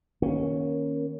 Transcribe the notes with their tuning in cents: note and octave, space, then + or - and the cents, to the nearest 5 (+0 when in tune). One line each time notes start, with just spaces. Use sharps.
D#3 +0 A#3 +15 C#4 +0